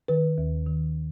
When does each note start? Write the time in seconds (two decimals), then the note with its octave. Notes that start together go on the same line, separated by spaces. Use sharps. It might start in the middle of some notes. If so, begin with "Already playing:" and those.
0.08 D#3 B4
0.38 D#2
0.66 D#3